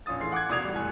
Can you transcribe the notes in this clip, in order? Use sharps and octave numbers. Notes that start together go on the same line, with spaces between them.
A#1 C#4 F4 D#6 A6
A2 E3 G#4 F5 C6 C7
F#5 D6 F#6 G#6
E1 F#4 D5 D#6 G#6 F7
A1 G3
F1 G3 A3 G#5 F#6